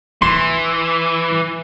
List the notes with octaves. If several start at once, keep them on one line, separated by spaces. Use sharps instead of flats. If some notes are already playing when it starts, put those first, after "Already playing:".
E3 C6